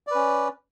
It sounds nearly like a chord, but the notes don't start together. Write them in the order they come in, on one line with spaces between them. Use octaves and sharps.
D5 B4 C#4